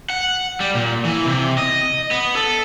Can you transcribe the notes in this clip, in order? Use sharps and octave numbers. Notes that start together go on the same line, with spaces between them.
F#5
G3
A#2
E3
C3
D#5
B3
A4